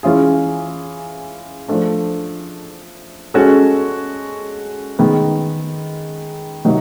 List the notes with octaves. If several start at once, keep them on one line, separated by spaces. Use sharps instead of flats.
E3 G#3 C#4 F4 G#4
F3 A3 D4
G#3 C#4 F#4 A4
D#3 G#3 B3
C3 D#3 F#3 A#3 D#4